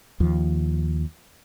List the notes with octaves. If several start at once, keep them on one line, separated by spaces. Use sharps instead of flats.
D#2 F3